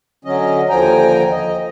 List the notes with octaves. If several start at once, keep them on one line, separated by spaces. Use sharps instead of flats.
D3 F#3 C#4 D#5
D#2 D3 F3 G5 G#5 A#5
D#5